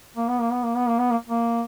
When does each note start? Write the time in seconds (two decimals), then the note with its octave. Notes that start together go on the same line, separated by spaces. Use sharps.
0.17 A#3
0.28 B3
0.40 A#3
0.52 B3
0.64 A#3
0.76 B3
0.87 A#3
0.99 B3
1.11 A#3
1.28 A#3